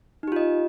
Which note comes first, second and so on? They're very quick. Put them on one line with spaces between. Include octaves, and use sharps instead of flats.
D#4 G4 F4 D#5